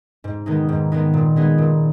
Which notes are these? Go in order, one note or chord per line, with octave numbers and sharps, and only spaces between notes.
G#2
D#3 G#3 B3 D#4
G#2
D#3 G#3 B3 D#4
A#2
G#3 B3 D#4 G#4
A#2